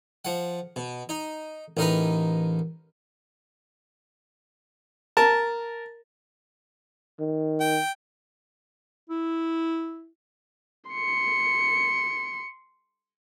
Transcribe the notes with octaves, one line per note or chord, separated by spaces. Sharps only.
F3 F#5
B2
D#4
A1 D#4 A#4 B4
A#4 A5
D#3
G5
E4
C6 C#7